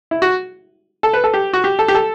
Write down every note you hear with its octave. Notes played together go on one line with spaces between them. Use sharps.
E4
F#4
A4
B4
A4
G4
F#4
G4
A4
G4
A4